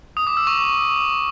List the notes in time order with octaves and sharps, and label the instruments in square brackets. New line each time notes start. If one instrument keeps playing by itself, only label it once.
[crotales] D#6
D6
E6
C#6